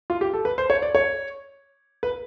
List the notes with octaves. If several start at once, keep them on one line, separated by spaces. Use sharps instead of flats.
F4
G4
A4
B4
C5
C#5
D5
C#5
B4